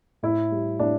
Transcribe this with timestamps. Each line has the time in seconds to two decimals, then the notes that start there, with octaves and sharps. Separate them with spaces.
0.23 A2 E4
0.52 G3
0.79 A2 D4